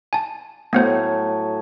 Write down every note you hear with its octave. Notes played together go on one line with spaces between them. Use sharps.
G#5 A5
A2 F#3 A3 B3 C5 G#5